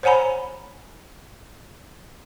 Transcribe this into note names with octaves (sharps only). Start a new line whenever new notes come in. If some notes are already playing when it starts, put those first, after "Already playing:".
C5 C#5 F#5 G#5 A#5 B5